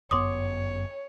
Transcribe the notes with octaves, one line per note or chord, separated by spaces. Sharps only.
G1 F#2 B3 C#5 C6 D6 D#6